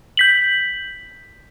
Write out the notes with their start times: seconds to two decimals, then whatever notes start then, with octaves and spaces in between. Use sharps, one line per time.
0.17 G6 B6 F#7